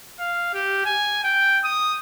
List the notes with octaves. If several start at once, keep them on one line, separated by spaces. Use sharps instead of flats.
F5
G4
G#5
G5
D#6